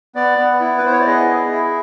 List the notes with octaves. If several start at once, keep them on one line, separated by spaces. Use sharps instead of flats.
B3 D5
B3
E4
B4
B3 C5
C#5
D5
G#4 D#5
E4
E4